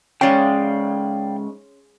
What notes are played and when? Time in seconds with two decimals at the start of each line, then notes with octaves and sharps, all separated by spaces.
0.21 G#2 C#3 G#3 C#4 D5 F5 G5